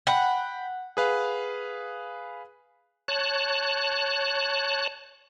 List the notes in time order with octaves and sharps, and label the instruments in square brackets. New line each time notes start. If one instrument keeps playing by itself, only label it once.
[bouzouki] F#5 [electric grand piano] G5 B5
[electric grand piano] G#4 B4 F5
[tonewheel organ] C#5 A5 F#6